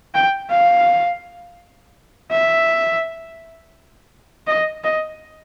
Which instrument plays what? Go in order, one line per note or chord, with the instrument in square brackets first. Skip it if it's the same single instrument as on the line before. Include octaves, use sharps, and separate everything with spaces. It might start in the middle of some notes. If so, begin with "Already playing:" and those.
[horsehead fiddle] G5
F5
E5
D#5
D#5